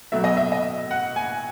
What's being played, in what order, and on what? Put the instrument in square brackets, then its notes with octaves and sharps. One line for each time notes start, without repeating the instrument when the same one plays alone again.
[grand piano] B2 F#3 A3 E5
D#5
E5
D#5
F#5
G#5